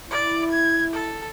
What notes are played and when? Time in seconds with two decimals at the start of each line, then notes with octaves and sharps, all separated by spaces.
0.11 E4 D5
0.51 G#6
0.93 A4